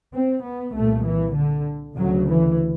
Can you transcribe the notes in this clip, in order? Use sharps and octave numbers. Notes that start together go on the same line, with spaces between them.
C4
B3
C2 A#2 A3
E3
D3
D2 C#3 F#3
E3